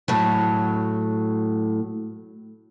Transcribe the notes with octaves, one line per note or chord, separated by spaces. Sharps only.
A2 F#3